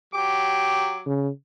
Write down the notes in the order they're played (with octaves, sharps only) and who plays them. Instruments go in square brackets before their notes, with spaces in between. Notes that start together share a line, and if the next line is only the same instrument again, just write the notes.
[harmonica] F#3 D6 [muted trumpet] G4
[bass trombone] C#3